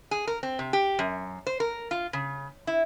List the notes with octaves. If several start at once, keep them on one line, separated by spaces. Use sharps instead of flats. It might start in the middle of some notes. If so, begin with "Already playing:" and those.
G#4
A#4
C4
C3
G4
F#2
C5
A#4
F4
C#3
E4